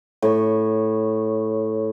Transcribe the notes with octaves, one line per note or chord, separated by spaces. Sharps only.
A2 C#5